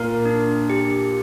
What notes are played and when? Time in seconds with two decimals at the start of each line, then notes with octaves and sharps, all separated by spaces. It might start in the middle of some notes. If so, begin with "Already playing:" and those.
Already playing: A#2 A#3 A#4
0.25 D4
0.70 G4